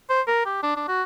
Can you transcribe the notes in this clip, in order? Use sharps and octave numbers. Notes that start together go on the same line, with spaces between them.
C5
A#4
G4
D4
D4
F#4